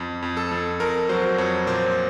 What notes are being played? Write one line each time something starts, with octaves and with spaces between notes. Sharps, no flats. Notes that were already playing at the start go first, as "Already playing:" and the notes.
Already playing: F2
F2
A4
F2
F2 A#4
F#3 C5
F2 C#5
A#2 C5